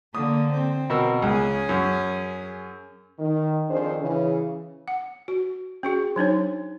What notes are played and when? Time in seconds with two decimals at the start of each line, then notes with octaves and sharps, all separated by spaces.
0.15 D3 A#3 D#6
0.52 C4
0.90 B2 A#4 E6
1.22 C#2 C#4 G#4
1.69 F#2
3.19 D#3
3.69 F2 D#3 D4 G#4 C5
4.00 C#3 E3
4.88 F#5
5.28 F#4
5.83 C#4 F#4 G#4
6.16 F#3 D4 D#4 C#5